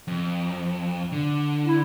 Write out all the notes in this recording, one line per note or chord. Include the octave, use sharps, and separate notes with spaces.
F2
D3
E4